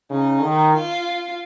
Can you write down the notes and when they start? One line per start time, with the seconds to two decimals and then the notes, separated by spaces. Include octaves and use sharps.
0.10 C#3 D#4
0.42 D#3
0.74 F4